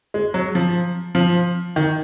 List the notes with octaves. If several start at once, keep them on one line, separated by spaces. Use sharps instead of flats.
G#3
F#3
F3
F3
D#3